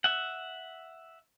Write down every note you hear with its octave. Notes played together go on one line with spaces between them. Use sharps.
E5 F#5